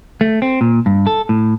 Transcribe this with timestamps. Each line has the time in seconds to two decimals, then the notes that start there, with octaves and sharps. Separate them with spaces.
0.21 A3
0.42 C4
0.61 A#2
0.86 G2
1.07 A4
1.29 A2